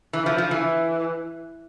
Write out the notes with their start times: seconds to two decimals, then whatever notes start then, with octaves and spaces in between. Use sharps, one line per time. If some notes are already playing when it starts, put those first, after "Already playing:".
0.13 E3
0.26 F3
0.38 F3
0.51 E3